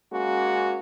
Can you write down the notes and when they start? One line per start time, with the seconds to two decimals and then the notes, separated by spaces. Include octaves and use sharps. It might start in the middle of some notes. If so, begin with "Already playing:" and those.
0.12 G#3 A#3 C#4 F#4